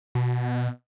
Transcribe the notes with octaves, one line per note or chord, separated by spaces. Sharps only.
B2